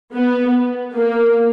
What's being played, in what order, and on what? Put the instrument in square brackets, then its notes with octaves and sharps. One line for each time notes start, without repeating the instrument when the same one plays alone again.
[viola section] B3
A#3